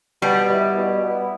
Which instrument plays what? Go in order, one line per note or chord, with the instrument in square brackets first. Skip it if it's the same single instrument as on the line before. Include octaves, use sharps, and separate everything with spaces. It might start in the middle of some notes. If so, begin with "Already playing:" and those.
[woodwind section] B2 [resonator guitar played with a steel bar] G3
[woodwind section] B3 E4
B2
B3 E4